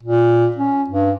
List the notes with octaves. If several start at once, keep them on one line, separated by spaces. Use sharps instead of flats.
A#2
C#4
G2